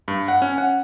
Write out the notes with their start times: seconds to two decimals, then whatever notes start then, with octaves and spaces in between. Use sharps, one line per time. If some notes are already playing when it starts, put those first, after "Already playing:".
0.08 G2
0.28 F#5
0.42 C#4
0.58 F#5